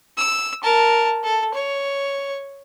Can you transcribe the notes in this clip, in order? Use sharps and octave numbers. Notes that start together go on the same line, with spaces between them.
E6
A#4 A5
A4
C#5